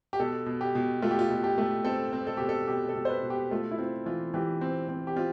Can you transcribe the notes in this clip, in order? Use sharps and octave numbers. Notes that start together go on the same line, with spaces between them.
G4
B2 A4
B2
G4
B2
A3 F4
G4
F4
B2
G4
A3
C4 A4
C4
A4
B2 G4
A4
B2 G4
A4
B2
C5
B4
B2
G4
A3 F4
E4
C4 F4
E3 F4
E3 G4
C4
C4
G4
C4 F4